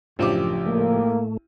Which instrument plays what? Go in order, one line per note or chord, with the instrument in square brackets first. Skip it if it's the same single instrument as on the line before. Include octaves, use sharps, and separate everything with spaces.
[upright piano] A1 G4 D6 [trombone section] F#2 [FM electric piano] C#3 F3 D4
[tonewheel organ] A2 A3 [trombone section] A#3